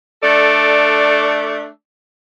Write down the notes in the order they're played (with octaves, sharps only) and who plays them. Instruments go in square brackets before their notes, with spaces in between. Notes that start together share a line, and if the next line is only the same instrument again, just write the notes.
[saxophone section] A3 D4 A4 D5